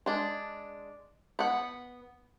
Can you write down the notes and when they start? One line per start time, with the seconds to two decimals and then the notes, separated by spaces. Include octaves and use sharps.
0.06 G#3 D4
1.39 B3 F#5